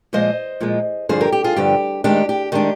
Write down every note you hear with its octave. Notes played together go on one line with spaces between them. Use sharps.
A#2 F3 G#3 C5 D#5
A#2 F3 G#3
G2 D3 F3 G#4 C5
G4 A#4
G4
F4 G#4
G2 D3 F3 G4
D#3 G#3 D4 G4
G4
D#3 G#3 D4 G4